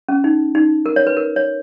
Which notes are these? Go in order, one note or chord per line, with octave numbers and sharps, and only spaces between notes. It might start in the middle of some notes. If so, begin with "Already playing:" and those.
C#4
D#4
D#4
A#4
C#5
B4
A#4
C#5